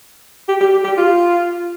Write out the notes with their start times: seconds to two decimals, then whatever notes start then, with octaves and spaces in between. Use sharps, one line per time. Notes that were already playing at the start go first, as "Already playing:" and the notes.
0.49 G4
0.61 G4
0.72 G4
0.85 G4
0.98 F4